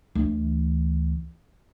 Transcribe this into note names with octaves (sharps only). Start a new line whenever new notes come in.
D2 E3